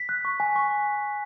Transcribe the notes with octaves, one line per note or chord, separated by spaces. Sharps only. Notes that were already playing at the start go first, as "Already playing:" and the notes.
Already playing: B6
F#6
C#6
G#5
C#6